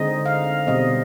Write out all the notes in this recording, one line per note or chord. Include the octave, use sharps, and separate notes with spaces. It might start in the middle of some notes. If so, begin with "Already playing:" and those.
Already playing: D3 G#3 C4 D#4 D#5
F5
B2 G3 C4 D#5